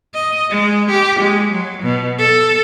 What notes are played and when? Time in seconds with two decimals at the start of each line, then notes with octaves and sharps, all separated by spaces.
0.15 D#5
0.50 G#3
0.90 G4
1.20 G#3
1.51 F#3
1.83 B2
2.19 A4